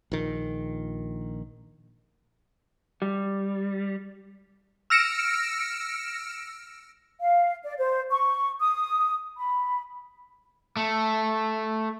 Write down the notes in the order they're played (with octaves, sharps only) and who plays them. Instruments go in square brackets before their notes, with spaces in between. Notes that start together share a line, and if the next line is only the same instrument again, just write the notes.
[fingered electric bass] A#1 D#3
[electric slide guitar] G3
[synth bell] E6 F6 A#6 C#7 D7 E7
[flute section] F5
D5
C5
C#6
D#6
B5
[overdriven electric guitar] A3